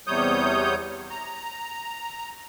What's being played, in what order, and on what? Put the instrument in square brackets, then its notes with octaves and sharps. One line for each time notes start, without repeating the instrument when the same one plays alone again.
[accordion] E2 C3 G3 C#5 D#6 G6
A#5